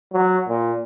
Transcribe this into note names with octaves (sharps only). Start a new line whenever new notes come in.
F#3
A#2